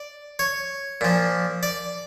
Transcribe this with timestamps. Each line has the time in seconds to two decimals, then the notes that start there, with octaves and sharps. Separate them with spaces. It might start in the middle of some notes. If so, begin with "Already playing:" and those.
Already playing: D5
0.39 C#5
1.01 A#2 F3
1.63 D5